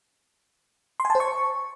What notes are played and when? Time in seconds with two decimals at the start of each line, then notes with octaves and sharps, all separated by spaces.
1.00 C6
1.05 G#5
1.10 A5
1.15 C5
1.20 C#6